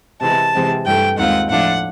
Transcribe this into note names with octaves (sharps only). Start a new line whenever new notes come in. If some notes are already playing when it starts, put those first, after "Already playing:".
C3 E3 G#3 A5
C3 E3 G#3 C4
G2 E3 A3 G5
D#2 D#3 G#3 C4 F4 F#5
A2 F3 A3 D4 F4 F#5